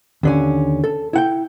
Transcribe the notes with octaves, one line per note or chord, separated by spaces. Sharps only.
D#2 D3 C#4
A4
E4 F#5 G5